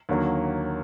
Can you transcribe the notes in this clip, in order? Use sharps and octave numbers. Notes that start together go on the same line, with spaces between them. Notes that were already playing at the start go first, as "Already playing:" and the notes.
D#2 D3 F#3 A#3